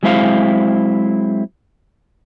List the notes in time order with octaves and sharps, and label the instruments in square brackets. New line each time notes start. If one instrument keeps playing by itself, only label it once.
[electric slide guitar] F#3 G#3 C4 E4 C5 F5